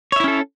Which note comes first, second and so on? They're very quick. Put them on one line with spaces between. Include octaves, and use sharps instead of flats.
C#5 E5 E4 C#4 A4